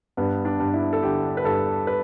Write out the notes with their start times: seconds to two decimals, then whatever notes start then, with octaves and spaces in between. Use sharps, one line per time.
0.17 G2 B3
0.45 D4
0.60 G2
0.74 E4
0.93 A4
1.02 D3 G4
1.37 B4
1.44 G2 A4
1.87 B4